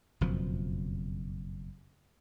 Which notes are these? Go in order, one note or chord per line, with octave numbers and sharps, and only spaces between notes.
F#1 F2 B2 F3